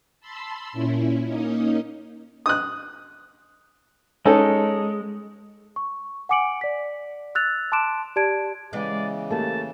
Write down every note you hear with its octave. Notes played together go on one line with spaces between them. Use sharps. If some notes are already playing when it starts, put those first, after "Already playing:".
A5 B5 C6 E6
A#2 C#4 E4
A#3 C#4 D#4 D#5
D#6 F#6
G#3 C#4 D#4 A4
C#6
F#5 G#5 D6 C#7 D7 F#7
D5 B6
E6 F#6 A6 F7
A5 C6 D6 F#6 D7 E7
G4 D5 A5 G#6 D7
C#3 E3 G#3 B3 D5
A3 A#3 G4 A5